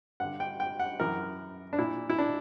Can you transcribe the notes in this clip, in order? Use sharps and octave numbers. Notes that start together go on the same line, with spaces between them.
G2 D3 F#5
G5
G5
F#5
F#2 E3 A#4
D4
A#2 E4
E4
D4